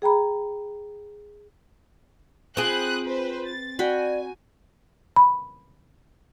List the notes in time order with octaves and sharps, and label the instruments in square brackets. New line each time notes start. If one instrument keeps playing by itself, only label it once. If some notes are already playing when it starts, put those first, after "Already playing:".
[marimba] G#4 G5 A#5 B5
[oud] C4 G#4 [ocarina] F4 [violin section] B5 D#6 F#6
[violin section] B4 C5
A6
[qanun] F#4 G5 B5 [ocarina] D5 [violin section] G#5
[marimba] B5